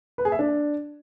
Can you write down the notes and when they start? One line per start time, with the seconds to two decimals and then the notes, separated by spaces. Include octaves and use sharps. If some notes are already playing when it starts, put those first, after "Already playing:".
0.18 B4
0.25 G#4
0.32 E5
0.39 D4